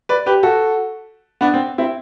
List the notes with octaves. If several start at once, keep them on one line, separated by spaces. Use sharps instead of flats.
B4 D5
G4 B4
F#4 A4
B3 D4
C4
C4 E4